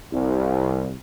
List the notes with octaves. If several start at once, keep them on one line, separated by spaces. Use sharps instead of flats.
C2